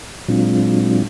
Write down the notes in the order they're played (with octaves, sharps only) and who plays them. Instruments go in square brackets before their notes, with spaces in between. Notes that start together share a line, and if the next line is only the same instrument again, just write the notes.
[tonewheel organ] A#2 F#3 G#3 C4 D4 F4